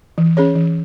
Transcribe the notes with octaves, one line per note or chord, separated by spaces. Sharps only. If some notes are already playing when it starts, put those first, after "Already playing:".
E3
C#4 G#4 C#5
E3